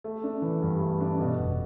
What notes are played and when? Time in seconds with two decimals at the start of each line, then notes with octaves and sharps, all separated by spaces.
0.04 A3
0.24 D4
0.42 E3
0.62 G2
0.81 A3
1.01 D4
1.20 B2
1.39 F1